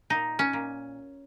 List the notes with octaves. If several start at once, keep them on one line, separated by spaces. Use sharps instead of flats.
A#2 D#4
C#4
A#2